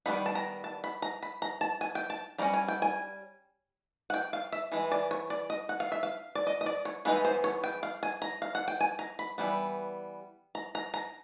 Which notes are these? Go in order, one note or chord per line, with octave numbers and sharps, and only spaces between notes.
D#3 G3 B3 D#4 B5
A5
A#5
A5
B5
A#5
B5
A#5
A5
G#5
G5
A5
G3 A#3 C#4 A#5
G#5
G5
G#5
F#5
G5
F5
E5
E3 G#3
D5
C#5
D5
D#5
F#5
F5
E5
F5
D5
D#5
D#5
D5
C#5
E3 G#3 B3 D#4 B4
C5
C#5
G5
F5
G#5
A#5
F5
F#5
G5
G#5
A#5
B5
E3 G3 B3
A#5
A#5
A#5